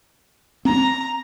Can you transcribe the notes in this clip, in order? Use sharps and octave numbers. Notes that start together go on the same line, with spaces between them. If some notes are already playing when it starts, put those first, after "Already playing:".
C4 A#5